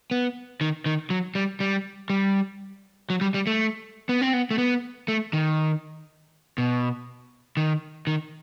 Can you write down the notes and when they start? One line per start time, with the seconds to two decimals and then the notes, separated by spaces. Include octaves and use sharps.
0.11 B3
0.61 D#3
0.86 D#3
1.10 F#3
1.35 G3
1.60 G3
2.10 G3
3.10 F#3
3.21 G3
3.34 G3
3.47 A3
4.09 B3
4.21 C4
4.33 B3
4.51 A3
4.58 B3
5.08 A3
5.33 D#3
6.58 B2
7.57 D#3
8.07 D#3